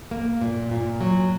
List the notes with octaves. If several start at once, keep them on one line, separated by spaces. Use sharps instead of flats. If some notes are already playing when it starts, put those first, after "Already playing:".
A#3
A#2
A#2
F#3